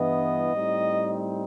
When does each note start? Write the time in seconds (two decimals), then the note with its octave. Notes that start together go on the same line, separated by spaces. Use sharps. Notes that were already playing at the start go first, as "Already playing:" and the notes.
Already playing: G2 E3 B3 D#5
0.54 A2 G3 C4 D#4